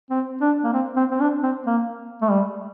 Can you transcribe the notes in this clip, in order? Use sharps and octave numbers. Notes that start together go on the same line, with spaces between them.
C4
D4
A#3
C4
C4
C4
D4
C4
A#3
A3
G3